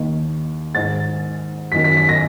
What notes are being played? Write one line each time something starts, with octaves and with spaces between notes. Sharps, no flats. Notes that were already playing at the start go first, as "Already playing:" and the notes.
Already playing: D#2 D#3
G#2 D#3 A6
F#2 D#3 B6
B6
B6
A#6